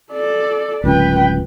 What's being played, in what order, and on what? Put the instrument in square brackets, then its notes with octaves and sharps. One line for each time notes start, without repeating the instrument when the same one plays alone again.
[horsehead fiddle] A4 D5
[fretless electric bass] D1 C#2 [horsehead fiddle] B4 G5